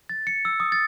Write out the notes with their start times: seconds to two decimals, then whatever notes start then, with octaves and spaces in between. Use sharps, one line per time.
0.09 A6
0.27 C#7
0.45 E6
0.60 D#6
0.72 A6